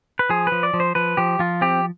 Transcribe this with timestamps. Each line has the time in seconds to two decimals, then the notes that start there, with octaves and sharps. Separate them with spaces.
0.19 B4
0.29 F3 G#4
0.47 F3 B4
0.63 D5
0.74 F3
0.80 C5
0.95 F3 B4
1.17 F3 G4
1.39 F3 F4
1.61 C4 G4